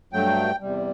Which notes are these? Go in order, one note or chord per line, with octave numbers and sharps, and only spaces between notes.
G2 F#3 A3 G5
E2 C3 G3